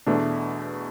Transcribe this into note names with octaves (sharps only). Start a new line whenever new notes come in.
E2 B2 A3 D4